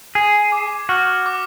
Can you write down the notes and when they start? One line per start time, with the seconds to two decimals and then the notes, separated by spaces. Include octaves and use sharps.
0.15 G#4 G#6
0.52 D6
0.89 F#4 F6
1.26 D6